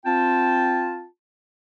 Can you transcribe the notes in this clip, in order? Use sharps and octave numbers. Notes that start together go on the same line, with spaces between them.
C4 F4 G5 A5